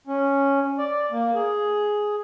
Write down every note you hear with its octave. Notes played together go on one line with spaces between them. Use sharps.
C#4
D5
A#3
G#4